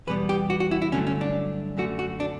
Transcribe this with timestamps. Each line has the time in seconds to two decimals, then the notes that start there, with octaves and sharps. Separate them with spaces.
0.07 E2 B2 G3 B3 B4
0.29 G4
0.50 F#4
0.60 F#4
0.71 E4
0.82 E4
0.92 G2 D3 F#3 A3 C#4
1.07 C#4
1.21 D4
1.77 F#2 D3 A3 F#4
1.99 F#4
2.20 D4